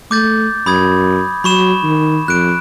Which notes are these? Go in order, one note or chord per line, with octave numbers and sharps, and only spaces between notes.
A3 D6 G6 A6
F#2 B5 D#6 G#6
F#3 B5 C#6 E7
D#3
F2 F#6 D7